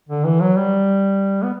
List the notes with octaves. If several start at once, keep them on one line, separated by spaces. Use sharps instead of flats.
D3
E3
F#3
G3
B3